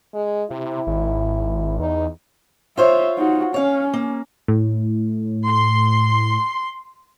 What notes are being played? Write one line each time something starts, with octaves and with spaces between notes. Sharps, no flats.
G#3
C3 E4
G#1
E2 D#4
F4 C5 C#5 E5
D#4 F#4
C#4 C#5 F5
A#3
A2
C6